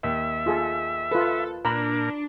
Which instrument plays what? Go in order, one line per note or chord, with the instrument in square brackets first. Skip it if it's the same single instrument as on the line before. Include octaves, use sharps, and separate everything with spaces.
[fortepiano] D#2 [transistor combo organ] E5
[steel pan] F4 G#4 A4
[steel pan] F4 B4 [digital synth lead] A4
[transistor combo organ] A#2 A#4 [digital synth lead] D4 [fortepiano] A#5 B5